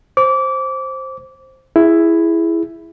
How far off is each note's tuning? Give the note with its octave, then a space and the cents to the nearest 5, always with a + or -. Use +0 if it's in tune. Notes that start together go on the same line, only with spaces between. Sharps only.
C5 +10 D6 -25
E4 +5 G#4 +0